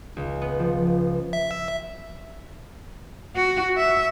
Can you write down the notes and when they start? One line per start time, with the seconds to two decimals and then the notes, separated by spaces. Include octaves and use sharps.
0.17 C#2
0.42 B3
0.59 F3
1.33 E5
3.36 F#4
3.77 E5